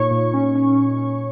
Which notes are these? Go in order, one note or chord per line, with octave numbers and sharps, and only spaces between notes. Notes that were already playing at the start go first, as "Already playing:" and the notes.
Already playing: A#2 D#4 C#5 C#6
A#2
C#4
C#4